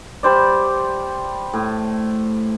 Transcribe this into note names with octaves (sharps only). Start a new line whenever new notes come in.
G3 C5 D5
A2